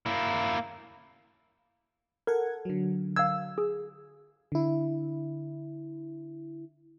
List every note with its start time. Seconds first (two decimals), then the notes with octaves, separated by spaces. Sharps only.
0.06 A#3 E4
2.27 A4 A#4 F#5 G#6
2.65 D3 F#3
3.16 F5 E6 G#6
3.58 G#4
4.52 D3 E4